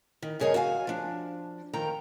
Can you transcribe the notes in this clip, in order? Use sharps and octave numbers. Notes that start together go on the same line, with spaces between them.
D#3
G2 C#3 G#4 A#4 C#5 D#5
F#4 F5 F#5 G#5
F3 D4
F2 D#3 G5 A#5